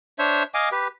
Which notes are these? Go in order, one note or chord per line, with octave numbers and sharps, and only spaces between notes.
D4 C5 C#5 E5
D#5 F5 G#5 D6
G4 B4